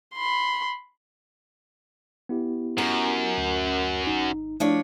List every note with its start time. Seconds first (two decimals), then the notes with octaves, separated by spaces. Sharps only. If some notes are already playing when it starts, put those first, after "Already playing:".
0.15 B5 C6
2.29 B3 E4 G4
2.78 F#2 A#4
3.38 D2
4.07 G#1 D#4
4.60 F3 A3 D4 E4 C#5 D5